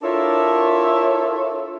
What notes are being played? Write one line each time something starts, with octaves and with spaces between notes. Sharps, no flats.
D4 E4 F4 A4 A#4 C#5